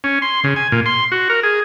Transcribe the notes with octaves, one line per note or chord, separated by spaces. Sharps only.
C#4
C6
C#3
G#5
A#2
C6
F#4
A#4
G#4